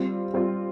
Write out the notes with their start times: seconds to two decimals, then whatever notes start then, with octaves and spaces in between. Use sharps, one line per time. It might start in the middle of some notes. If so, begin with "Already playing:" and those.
Already playing: G3 C4 F4
0.34 G3 C4 F4